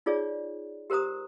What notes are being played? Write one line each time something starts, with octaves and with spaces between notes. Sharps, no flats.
D#4 F4 G#4 C#5 D5
G4 A#4 C5 A#5 D#6